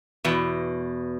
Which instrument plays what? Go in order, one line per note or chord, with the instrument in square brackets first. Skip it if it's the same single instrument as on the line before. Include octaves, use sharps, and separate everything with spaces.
[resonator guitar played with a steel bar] E2 B2